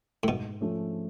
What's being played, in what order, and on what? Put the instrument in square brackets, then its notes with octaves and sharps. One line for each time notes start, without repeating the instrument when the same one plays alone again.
[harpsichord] A2
[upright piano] G#2 [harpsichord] B2
[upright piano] F3 A3 C#4